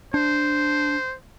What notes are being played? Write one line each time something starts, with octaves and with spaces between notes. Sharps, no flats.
D4 C5